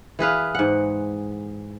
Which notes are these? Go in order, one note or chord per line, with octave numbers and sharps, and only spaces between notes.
E3 G#4 B4 F5
G#2 F#5